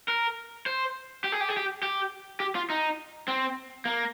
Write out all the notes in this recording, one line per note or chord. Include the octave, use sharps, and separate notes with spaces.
A#4
C5
G4
G#4
G4
G#4
G4
G4
G4
F4
D#4
C4
A#3